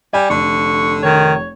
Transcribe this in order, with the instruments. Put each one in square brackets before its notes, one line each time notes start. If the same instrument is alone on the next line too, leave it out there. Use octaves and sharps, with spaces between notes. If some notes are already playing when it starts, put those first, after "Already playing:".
[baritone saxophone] G3 [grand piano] D5 [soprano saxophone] G#5
[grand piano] F1 [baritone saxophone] D3 [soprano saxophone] C#6
[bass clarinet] D#3 [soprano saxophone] C#5